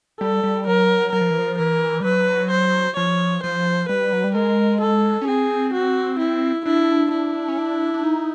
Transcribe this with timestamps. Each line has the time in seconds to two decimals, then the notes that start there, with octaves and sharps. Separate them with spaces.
0.21 G3 A4
0.43 G3
0.67 F#3 A#4
1.12 F#3 A#4
1.21 F3
1.30 E3
1.38 F3
1.58 E3 A#4
2.00 G3
2.05 F#3 B4
2.51 C5
2.97 F3 C#5
3.43 F3 C5
3.89 G3 B4
4.13 F#3
4.24 G3
4.35 G#3 A#4
4.81 A4
5.21 C#4
5.28 C4 G#4
5.74 F#4
6.19 E4
6.65 D4 E4
7.12 E4
7.48 C#4
7.58 D4
7.94 D4
8.04 D#4